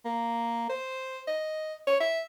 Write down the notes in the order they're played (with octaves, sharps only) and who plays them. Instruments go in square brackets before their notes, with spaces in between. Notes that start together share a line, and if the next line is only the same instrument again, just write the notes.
[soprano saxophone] A#3
C5
D#5
C#5
E5